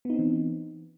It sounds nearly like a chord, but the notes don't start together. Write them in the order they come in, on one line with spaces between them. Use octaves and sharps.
B3 D#4 C4 E3